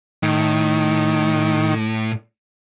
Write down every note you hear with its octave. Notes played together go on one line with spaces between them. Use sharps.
A2 D#3